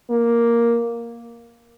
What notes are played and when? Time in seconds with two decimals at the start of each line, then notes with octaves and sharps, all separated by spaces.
0.10 A#3